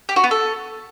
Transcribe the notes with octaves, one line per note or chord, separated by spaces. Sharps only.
G4
F#4
B3
A4